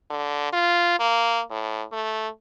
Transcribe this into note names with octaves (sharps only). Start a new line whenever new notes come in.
D3
F4
A#3
A2
A3